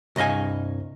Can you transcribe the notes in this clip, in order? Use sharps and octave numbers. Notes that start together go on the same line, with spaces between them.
C2 G2 D#5 F5 G#5